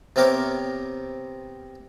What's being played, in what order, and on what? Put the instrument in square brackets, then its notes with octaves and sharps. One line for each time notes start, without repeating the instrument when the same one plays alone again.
[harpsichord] C3 B3 C4 A#4 C#5 D6